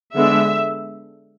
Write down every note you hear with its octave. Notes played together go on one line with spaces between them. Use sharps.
D3 G#3 B3 D4 E5